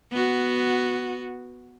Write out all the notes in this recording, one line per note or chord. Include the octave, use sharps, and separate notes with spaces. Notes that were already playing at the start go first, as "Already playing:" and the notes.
B3 F#4